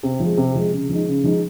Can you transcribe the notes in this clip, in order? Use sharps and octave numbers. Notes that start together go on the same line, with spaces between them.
C3
F3 G#3
C3
F3 G#3
C#3
F3 G#3 D#4
C#3
F3 G#3 D#4